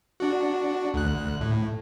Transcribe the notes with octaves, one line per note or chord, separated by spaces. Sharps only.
D4 F#4
D2 F#6
A2